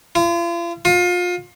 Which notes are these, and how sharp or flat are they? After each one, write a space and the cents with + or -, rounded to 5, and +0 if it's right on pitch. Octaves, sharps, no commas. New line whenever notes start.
F4 -40
F4 +30